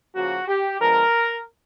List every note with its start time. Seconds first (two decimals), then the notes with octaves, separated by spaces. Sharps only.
0.14 C#3 F3 A#3 F#4
0.48 G4
0.79 D3 F3 G#3 B3 A#4